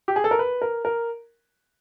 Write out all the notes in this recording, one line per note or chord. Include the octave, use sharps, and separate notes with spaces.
G4
G#4
A4
A#4
B4
A#4
A#4